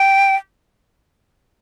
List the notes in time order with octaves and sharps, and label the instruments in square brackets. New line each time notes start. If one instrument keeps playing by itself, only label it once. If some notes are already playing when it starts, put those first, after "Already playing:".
Already playing: [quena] G5